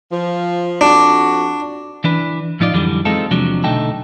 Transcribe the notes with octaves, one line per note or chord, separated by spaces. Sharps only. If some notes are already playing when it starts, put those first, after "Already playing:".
F3
F2 D4 F#4
E3 D4 B4
A2 F3 D#4 F4 D5
F2 D3 E3 F#3 G3
G#3 C4 D#4 F4 A4
E2 C3 F3 F#3 D4
B1 D3 A3 D#4 G5 A5